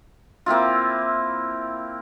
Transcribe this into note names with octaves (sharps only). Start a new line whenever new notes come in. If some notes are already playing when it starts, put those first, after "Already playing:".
A#3 C4 E4 F4